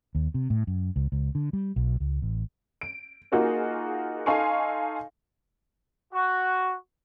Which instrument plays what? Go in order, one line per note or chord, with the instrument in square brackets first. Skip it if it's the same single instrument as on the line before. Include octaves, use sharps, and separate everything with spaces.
[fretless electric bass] D#2
C3
A2
F#2
C#2
C#2
D3
G3
B1
C#2
A1
[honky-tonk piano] D7
A#3 D#4 F4 F#4 G#4 A#4
D#4 A4 F5 G#5 C6 C#6
[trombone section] F#4